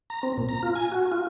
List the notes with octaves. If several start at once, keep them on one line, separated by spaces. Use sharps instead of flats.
A#5
C4
A#2
A#5
F4
G#5
F#4
F4